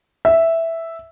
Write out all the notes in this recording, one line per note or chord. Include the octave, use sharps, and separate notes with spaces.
E5